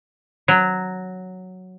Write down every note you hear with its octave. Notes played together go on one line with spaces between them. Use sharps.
F#3